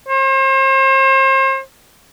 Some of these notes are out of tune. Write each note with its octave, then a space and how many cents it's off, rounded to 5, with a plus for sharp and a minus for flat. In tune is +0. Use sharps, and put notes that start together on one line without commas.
C5 +40